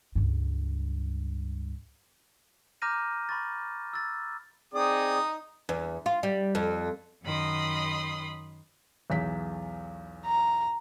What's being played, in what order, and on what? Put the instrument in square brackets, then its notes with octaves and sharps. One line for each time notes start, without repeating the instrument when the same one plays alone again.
[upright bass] C#2 G2
[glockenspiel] A#5 D6 F6 G6 A#6 D#7
B5 C#6 A6
E6 A6
[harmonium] C4 G#4 D5 [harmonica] D#4 D#6
[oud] E2
F4
G3
F2
[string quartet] F#2 D#3 B5 C6 D#6
[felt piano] B1 E2 B6
[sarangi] A#5